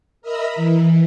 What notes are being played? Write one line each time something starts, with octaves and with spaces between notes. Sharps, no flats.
A#4 D#5 E5 A#5 B5
E3